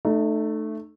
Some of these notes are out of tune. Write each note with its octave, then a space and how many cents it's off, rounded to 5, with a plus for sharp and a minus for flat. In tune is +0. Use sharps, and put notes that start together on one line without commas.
A3 +0 D#4 -40